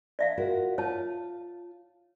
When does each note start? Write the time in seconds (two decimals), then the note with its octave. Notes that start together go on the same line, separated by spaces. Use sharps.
0.19 D5 E5 F5
0.37 F4 F#4 A#4
0.78 F4 C#5 A5